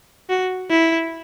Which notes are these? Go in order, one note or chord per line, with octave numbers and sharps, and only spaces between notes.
F#4
E4